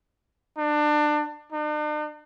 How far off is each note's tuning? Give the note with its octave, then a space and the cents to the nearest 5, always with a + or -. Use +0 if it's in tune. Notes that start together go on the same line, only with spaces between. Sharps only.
D4 +25
D4 +45